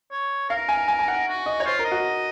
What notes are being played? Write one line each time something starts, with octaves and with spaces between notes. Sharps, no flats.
C#5
A#4 F5
G#5
G#5
G#5
F#5
F#4
D#5
C#5
F4 C5
A#4
D#5
F#4